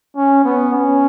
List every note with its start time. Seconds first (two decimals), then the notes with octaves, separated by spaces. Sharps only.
0.16 C#4
0.44 B3
0.73 C#4